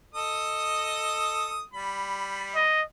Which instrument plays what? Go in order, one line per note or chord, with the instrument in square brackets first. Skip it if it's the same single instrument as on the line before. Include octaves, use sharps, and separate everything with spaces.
[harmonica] A4 D#5 D#6
G3 B5
[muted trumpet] D#5